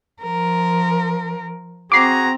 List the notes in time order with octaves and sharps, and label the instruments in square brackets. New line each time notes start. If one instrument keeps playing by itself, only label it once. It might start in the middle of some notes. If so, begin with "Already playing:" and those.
[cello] F3 A#4
[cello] C4 [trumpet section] F#4 G#4 A#5 [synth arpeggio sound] D6 C7